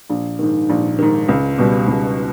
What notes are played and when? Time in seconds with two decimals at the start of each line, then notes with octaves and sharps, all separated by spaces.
0.10 A#1
0.39 G#2 D#3
0.69 A#1
0.99 G#2 D#3
1.28 C#2
1.59 B2 G3
1.88 C#2